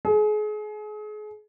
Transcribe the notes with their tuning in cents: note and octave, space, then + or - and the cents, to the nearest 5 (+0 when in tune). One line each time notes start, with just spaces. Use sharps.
G#4 +35